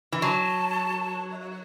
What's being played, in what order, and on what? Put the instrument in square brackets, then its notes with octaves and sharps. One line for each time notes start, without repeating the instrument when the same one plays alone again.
[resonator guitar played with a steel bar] E3
[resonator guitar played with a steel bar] F#3 [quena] A5